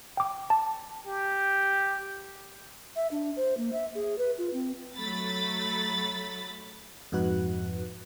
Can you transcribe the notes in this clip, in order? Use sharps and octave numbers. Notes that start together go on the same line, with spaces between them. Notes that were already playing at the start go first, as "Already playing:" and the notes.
G5 D6
A5
G4
E5
D4
C5
A#3
E5
G#4
B4
F4
C4
F#3 A3 B5 A6
F2 G#2 D#4 F#4 B4 F#6